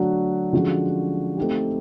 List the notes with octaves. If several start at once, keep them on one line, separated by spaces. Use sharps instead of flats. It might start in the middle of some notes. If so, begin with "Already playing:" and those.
Already playing: D3 F#3 A3 D4 F#4
D3 F3 G#3 C#4 F#4
A3 C4 D#4 G4